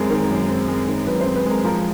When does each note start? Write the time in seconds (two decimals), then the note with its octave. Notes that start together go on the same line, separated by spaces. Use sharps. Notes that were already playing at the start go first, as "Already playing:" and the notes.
Already playing: F#2 G#3 C4 G#4 A#4
0.10 D#3
0.30 F#2
0.49 C4
0.68 G#3
0.88 D#3
1.07 F#2 B4
1.21 C5
1.26 C4
1.36 B4
1.46 G#3 A#4
1.64 F3 A#4